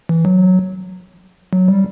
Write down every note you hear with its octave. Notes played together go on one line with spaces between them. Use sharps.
E3
F#3
F#3
G3